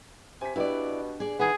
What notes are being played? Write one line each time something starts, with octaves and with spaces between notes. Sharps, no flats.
C3 G#5 B6
B2 D4 E4 G4 B4 D5
G#4 D5
D#3 B3 E4 G#4